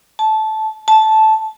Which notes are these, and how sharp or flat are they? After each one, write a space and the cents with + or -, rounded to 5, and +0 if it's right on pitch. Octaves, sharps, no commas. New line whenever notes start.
A5 -15
A5 -10